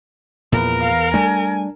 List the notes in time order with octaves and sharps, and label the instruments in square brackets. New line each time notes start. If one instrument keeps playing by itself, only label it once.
[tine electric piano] E2 B4 [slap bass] A#2 E3 F3 [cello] A#4
[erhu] F5
[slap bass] G3 A3 [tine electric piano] D4 [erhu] G#5